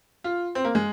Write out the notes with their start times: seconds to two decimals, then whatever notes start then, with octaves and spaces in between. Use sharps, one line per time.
0.24 F4
0.55 C4
0.65 A#3
0.75 G#3